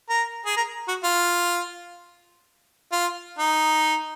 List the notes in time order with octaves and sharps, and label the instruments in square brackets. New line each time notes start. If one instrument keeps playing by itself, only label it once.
[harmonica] A#4
G#4
A#4
F#4
F4
F4
D#4